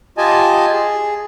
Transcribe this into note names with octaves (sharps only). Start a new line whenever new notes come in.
F4 G4 D#5 G#5 A5
G#4